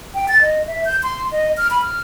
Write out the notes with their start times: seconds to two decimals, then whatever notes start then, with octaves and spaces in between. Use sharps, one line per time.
0.15 G5
0.28 A6
0.42 D#5
0.67 E5
0.85 G6
1.03 C6
1.32 D#5
1.57 F6
1.71 B5
1.82 F6